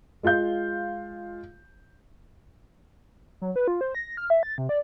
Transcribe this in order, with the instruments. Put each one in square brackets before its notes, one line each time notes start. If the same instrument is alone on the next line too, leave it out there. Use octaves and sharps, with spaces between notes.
[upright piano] G#3 F4 F5 G6
[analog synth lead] F#3
B4
F4
C5
A#6
F6
E5
A6
C3
D5